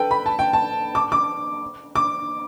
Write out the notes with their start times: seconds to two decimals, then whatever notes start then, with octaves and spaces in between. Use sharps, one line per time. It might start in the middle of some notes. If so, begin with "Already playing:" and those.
Already playing: A4 B4 G5
0.11 B5
0.26 A5
0.39 G5
0.53 A5
0.95 D6
1.12 D6
1.95 D6